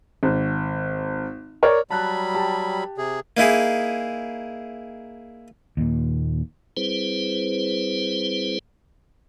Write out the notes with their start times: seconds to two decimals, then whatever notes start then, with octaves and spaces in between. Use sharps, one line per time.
0.23 G#1
1.63 A#4 C#5 D5
1.91 F#3 G3 A5 B5 F#6
2.34 G4 A5
2.98 C3 G#4
3.37 A#3 D#4 E4 G#4
5.77 D#2 A#2
6.77 G3 C4 E4 G#4 B4 C5